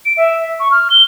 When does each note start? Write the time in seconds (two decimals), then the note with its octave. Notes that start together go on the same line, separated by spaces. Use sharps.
0.05 D7
0.17 E5
0.60 C#6
0.71 F6
0.90 G7